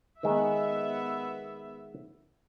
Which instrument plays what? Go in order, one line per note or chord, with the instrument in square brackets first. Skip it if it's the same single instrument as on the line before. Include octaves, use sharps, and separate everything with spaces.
[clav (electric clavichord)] D#3 G#3 [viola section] B3 E5